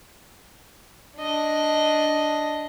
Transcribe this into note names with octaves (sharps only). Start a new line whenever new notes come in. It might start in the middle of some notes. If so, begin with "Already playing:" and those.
D4 D#5